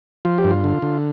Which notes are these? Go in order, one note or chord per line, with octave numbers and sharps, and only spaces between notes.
F3 F4
G4
G2
F4
D3
D3